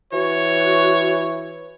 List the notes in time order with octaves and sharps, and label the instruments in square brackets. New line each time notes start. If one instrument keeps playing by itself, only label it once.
[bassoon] E3 [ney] F#4 [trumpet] C#5